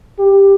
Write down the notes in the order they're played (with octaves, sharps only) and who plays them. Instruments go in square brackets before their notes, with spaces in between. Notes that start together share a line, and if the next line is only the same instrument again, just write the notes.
[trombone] G4